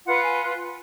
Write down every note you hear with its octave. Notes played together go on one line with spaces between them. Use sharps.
F4 B4 F#5
G#5